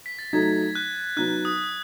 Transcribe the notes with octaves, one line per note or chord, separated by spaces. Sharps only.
B6
A6
F#3 A3 D#4 G#6
F#6
F#3 B3 D#4 F#6
D#6